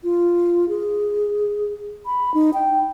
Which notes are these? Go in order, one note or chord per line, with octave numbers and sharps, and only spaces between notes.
F4
G#4
B5
D#4
G5